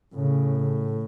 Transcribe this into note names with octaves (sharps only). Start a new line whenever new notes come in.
A2 C#3